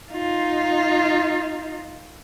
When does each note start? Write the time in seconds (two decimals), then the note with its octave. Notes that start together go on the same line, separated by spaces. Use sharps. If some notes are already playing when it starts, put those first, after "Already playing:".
0.12 D#4 F4